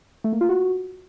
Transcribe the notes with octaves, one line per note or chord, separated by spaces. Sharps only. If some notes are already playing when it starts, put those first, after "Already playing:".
A3
A#3
F4
F#4